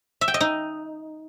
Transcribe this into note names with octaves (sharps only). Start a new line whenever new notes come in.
E5
G5
D#5
D#4